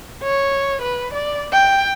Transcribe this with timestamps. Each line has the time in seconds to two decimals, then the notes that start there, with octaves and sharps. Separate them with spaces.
0.23 C#5
0.82 B4
1.13 D5
1.53 G5